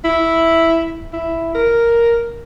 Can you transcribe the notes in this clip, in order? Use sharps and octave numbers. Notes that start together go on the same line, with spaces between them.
E4
E4
A#4